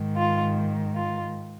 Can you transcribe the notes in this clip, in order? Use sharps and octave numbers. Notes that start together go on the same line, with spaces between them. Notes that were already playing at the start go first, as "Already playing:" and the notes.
Already playing: G#2 D#3
F4
F4